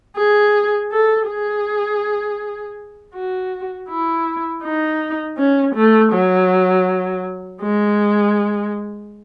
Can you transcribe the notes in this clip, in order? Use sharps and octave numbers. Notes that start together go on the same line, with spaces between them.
G#4
A4
G#4
F#4
E4
D#4
C#4
A3
F#3
G#3